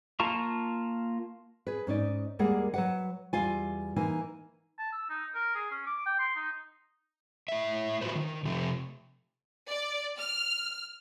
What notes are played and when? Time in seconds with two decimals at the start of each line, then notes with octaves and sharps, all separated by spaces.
0.20 A#3 F4 A5 A#5 C#6
1.67 G#4 B4
1.87 G#2 C#4 D#4 D5
2.39 D#2 G3 G#3 A#3 G#4 F#5
2.74 F#3 B4 F#5
3.33 E2 G3 F4 G#5
3.96 E3 A#3 D#4 G#5
4.79 A5
4.92 E6
5.10 D#4
5.35 A#4
5.55 G#4
5.71 C#4
5.87 D6
6.06 G5
6.19 C6
6.36 D#4
7.48 A2 E5
8.01 F4 F#4 A4 B4 C5
8.15 D#3
8.45 C3 F3 A3
9.70 D5
10.18 F6